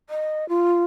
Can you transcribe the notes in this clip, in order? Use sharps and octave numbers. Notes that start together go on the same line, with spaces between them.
D#5
F4